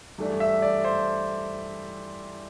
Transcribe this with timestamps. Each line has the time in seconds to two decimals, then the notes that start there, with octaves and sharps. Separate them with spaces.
0.18 G2 E3 A3 D4
0.40 E5
0.62 D5
0.84 C5